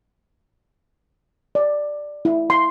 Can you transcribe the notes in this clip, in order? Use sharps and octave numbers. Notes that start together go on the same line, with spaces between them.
D5
E4
C6